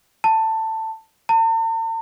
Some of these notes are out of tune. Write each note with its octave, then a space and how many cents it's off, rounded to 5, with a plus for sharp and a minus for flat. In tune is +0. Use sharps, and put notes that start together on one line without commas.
A5 +15
A5 +45